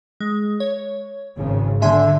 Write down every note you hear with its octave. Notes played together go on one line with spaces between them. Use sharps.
G#3
C#5
G#1 C#3
D3 E5 G#5 C6